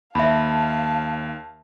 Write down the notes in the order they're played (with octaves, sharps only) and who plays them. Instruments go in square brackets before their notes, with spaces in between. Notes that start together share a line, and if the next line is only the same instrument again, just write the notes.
[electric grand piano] D#2 [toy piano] E5 B5 [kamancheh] F5 A5